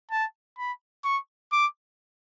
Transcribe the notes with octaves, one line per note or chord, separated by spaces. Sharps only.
A5
B5
C#6
D6